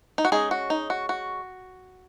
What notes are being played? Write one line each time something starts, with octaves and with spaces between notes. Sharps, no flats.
D#4
F#4
G#3 C#4 D#4 G#4
F#4
D#4
F#4
F#4